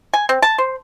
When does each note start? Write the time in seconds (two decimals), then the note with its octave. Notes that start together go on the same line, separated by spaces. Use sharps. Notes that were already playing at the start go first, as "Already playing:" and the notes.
0.14 G#5
0.29 C4
0.42 A5
0.58 C5